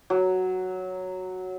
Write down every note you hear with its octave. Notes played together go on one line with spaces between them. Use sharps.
F#3